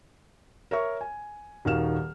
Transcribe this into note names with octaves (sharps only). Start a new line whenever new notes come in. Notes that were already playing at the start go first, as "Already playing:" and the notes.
A#4 C#5 E5 C#6
G#5
D#1 D#3 F#4 F5 F6 E7